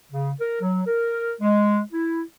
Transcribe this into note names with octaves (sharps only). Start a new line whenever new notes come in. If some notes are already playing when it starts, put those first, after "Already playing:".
C#3
A#4
F#3
A#4
G#3
E4